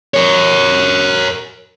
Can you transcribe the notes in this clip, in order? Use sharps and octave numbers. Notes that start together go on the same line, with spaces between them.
A#4 C#5